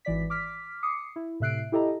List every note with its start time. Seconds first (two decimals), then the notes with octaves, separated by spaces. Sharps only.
0.05 G#1 E3 D5 B6
0.30 D6 F6 B6
0.83 D6 D#6 C7 C#7
1.16 E4
1.40 A2 C3 E5 F#6 C7 D7
1.72 E4 G4 A4 D#5 A#5